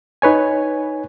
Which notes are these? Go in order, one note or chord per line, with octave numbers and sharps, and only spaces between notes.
D#4 B4 C#5 G#5